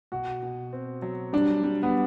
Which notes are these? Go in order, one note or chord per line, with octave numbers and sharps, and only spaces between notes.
B2 F#4
B2
C4
F#3
G3 D4
G3
B3